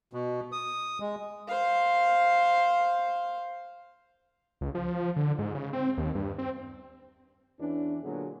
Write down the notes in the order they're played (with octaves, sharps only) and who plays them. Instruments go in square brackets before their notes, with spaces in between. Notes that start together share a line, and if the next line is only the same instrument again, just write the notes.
[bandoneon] B2
D#6
G#3
[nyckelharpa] C5 F5
[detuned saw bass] C#2
F3
D3
G#2
C#3
C4
D#2
G2
C4
[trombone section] E2 E3 C#4 D4
A#2 D3 F#3 B3 F#4 G#4